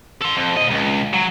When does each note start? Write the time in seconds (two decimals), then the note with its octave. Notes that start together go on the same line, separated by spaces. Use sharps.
0.21 A4 C6
0.36 F2
0.57 A#2 D#5
0.70 C#2
1.13 F#3